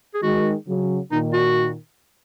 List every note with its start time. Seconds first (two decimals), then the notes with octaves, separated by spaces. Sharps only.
0.14 G#4
0.22 D#3 G#3 F#4
0.68 C#3 F#3
1.12 A#2 D#3 D#4
1.33 F#4